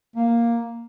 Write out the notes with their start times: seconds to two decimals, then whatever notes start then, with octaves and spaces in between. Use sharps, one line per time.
0.16 A#3